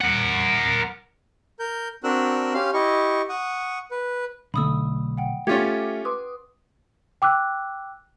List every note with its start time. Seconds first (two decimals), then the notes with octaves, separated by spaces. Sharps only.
0.01 A#4 F#5
1.59 A#4 G6
2.04 C4 D4 F#4 A#4 E6 F#6
2.54 C#4 G4 F5 C6
2.74 E4 G4 D#5 C#6
3.29 F#5 C#6 D#6
3.91 B4
4.54 B1 D3 A3 B5 D#6 E6
5.17 F#5 G5
5.47 A3 C#4 F4 G4 G#6 A6
5.73 D6
6.05 B4 C6 D6 D#6
7.22 G5 D6 E6 F#6